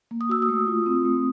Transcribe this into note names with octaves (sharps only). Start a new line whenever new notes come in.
A#3
D#6
F#4 E6
D#6
A3
F4
C4
A3